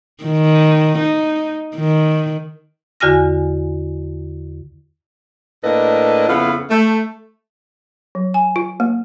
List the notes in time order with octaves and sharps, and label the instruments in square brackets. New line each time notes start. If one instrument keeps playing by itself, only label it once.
[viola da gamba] D#3
D#4
D#3
[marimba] E2 D3 F#4 G#5 F6 A#6
[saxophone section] A2 A#3 D4 A4 B4 D#5
F2 C#3 B3 E4 F4 F5
A3
[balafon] F#3
G#5
F4
A#3